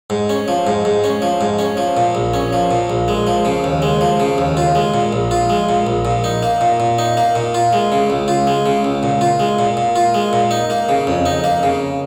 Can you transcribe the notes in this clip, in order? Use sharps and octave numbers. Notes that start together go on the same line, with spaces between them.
G#2
C#4
F3
G#2
G#2
C#4
F3
G#2
C#4
F3
A#2
A#1
C#4
F3
A#2
A#1
G#3
F3
C#3
D#2
G#3
F3
C#3
D#2
F4
G#3
A#2
A#1
F4
G#3
A#2
A#1
A#2
D#4
A#3
A#2
A#2
D#4
A#3
A#2
F4
G#3
C#3
C#2
F4
G#3
C#3
C#2
A#2
F4
G#3
A#2
A#2
F4
G#3
A#2
D#4
A#3
C#3
F2
D#4
A#3
C#3